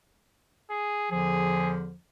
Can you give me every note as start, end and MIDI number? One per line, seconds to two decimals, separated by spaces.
0.70 1.07 68
1.11 1.94 40
1.11 1.94 50
1.11 1.94 53
1.11 1.73 68